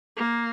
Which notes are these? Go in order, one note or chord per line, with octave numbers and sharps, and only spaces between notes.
A#3